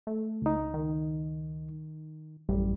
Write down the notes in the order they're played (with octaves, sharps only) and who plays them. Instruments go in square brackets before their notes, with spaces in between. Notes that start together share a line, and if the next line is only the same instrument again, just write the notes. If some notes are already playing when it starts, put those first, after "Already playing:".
[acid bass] A3
[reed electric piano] C#2 D#4
[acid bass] D#3
[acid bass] A1 [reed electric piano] F#2 G3